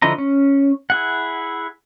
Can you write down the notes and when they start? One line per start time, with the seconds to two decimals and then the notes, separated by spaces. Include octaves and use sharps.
0.02 D3 F3 E4 D#5 A#5
0.18 C#4
0.90 E4 G#4 F#5